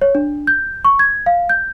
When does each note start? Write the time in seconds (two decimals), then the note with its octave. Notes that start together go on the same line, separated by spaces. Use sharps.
0.02 C#5
0.15 D4
0.47 G6
0.85 C#6
0.99 G#6
1.26 F5
1.49 G6